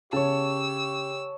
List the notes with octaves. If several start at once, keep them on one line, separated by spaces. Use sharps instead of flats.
C#3 G4 C#5 A5 E6